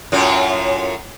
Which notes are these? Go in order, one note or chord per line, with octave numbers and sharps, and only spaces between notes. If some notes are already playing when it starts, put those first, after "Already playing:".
F#2 A2 F4